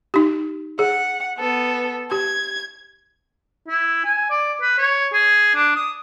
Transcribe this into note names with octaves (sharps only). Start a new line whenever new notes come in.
D#4 G4
G#4 F#5
B3 A4
G4 G#6
E4
G#5
D5
B4
C#5
G#4
D4
D#6